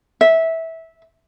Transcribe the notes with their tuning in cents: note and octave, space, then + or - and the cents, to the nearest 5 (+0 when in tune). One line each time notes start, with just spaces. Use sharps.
E5 -15